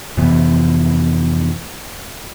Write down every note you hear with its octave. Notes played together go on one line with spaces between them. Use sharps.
F2 C3 E3 B3